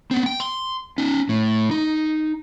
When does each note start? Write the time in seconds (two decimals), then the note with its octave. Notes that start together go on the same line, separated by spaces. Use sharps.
0.11 B3 C4
0.26 G5
0.40 C6
0.98 C#4 D#4
1.29 A2
1.71 D#4